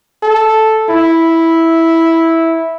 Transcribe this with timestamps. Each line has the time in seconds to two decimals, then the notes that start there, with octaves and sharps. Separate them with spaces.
0.23 A4
0.89 E4